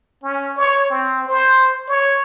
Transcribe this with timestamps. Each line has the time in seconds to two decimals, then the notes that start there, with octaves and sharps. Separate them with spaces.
0.23 C#4
0.57 C#5
0.90 C4
1.27 C5
1.88 C#5